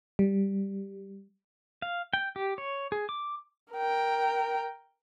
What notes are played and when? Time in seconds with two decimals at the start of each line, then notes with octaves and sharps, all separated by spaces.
0.19 G3
1.82 F5
2.13 G5
2.36 G4
2.58 C#5
2.92 G#4
3.09 D6
3.73 A#4 G5